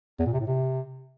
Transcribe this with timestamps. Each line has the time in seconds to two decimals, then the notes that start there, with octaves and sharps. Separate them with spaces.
0.19 E2
0.26 A#2
0.33 C3
0.40 A2
0.47 C3